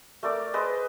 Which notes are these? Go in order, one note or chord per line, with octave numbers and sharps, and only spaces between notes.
A3 A#4 D5 D6
G#4 B4 C5 D#5